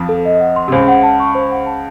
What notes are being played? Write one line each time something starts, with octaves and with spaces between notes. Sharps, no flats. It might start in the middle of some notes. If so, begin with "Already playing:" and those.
Already playing: F2 F3
A4
D#5
F#5
C6
C3
C#2 C#3 C5
F#5
A5
C#6
C5
F#5
A5